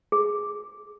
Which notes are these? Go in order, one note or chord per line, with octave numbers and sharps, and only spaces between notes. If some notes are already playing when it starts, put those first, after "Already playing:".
G#4